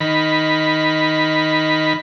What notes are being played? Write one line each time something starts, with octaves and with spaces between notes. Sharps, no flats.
D#3 B5